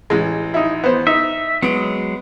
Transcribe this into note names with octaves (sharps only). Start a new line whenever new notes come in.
A1 E3 G#3
D#4 E4
B3 C5
D#4 E5
F#3 G#3 B3 D7